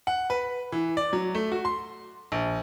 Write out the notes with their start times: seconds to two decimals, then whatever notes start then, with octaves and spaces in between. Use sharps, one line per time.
0.07 F#5
0.30 B4
0.72 E3
0.97 D5
1.13 F#3
1.35 A3
1.52 F#4
1.65 C6
2.32 A#1